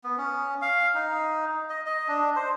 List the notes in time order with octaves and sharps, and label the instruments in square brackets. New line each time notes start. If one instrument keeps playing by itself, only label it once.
[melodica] B3
C#4
F5
D#4
D#5
D#5
D4
C5